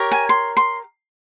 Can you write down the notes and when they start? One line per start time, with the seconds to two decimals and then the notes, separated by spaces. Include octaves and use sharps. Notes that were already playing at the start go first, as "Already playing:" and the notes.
Already playing: G4 A#4 C#5
0.12 G#5
0.29 C6
0.57 C6